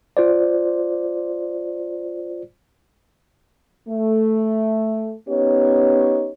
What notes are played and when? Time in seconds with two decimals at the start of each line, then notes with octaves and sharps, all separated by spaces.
0.17 F4 C5 D5
3.89 A3
5.29 B3 C#4 D#4 G4 C#5